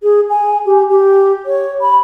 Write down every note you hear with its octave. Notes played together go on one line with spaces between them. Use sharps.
G#4
G#5
G4
G4
C#5
B5